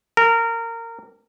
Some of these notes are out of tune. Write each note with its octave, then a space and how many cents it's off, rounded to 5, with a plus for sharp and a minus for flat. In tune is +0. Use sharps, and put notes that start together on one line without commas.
A#4 -20